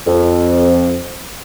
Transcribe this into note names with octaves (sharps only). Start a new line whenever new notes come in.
F2